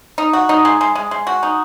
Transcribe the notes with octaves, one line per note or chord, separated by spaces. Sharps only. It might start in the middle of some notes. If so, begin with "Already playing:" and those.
D#4
F#4
D#4
G#3
G#3
G#3
G#3
F#4
D#4